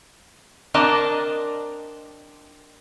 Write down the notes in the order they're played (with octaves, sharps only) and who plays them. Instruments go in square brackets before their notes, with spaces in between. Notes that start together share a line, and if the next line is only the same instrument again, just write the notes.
[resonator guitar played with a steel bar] C4 D4 A#4 D5 D#5 A5